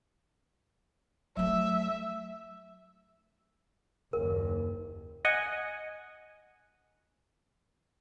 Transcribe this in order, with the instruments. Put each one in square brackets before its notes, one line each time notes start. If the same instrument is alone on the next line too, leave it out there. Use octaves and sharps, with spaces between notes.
[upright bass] F#3 A3 [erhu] E5
[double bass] F#1 D#2 [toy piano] A#4
[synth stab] D#5 F#5 G#5